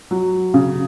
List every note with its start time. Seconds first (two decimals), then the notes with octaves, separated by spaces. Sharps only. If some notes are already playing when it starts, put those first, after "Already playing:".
0.11 F#3
0.54 C#3